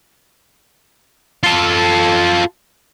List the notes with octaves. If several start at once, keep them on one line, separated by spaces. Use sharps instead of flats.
F4 A4